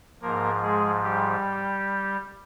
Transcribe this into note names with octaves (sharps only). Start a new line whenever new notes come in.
G#2 F3 A#3 A#4
G#3 G#4
G3 G4